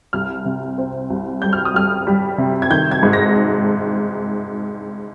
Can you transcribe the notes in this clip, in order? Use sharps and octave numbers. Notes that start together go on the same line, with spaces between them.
C2 F6
C3
C4
C2
G3 G6
F6
D#6
G3 F6
G3
C3
G#6
D#3 G6
G#6
G#2
A#6